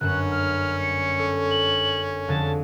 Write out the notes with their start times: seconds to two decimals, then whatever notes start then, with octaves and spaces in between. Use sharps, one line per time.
0.01 G1 F#2 C#4 F#6 E7
0.31 F6
0.80 C#7
1.19 A4
1.51 F#7
2.28 F2 D3 G#4 A5